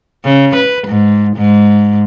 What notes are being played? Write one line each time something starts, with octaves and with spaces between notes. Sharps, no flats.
C#3
B4
G#2
G#2